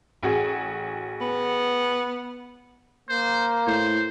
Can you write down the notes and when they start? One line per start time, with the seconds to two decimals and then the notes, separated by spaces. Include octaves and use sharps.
0.23 A1 F#4 G#4
1.21 B3
3.09 A#3 C5
3.67 A2 C5